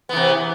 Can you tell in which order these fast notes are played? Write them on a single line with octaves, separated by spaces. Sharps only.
B3 E3 C3